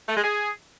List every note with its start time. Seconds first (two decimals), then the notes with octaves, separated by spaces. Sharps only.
0.08 A3
0.16 G#3
0.23 G#4